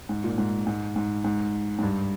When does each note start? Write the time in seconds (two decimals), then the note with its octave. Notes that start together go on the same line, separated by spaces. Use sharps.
0.09 G#2
0.24 A#2
0.38 G#2
0.67 G#2
0.96 G#2
1.24 G#2
1.78 G#2
1.83 G2